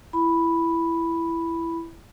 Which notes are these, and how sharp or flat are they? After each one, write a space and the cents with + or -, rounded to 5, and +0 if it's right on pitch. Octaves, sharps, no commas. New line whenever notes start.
E4 +15 B5 +0